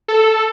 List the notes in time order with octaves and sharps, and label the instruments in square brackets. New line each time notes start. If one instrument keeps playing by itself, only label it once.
[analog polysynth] A4